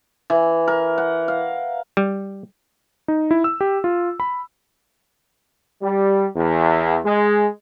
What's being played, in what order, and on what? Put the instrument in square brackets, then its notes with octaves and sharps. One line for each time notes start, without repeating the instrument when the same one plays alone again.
[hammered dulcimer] E3
A#4
F#5
F5
[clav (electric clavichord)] G3
[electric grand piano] D#4
E4
E6
G4
F4
B5
[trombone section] G3
E2
G#3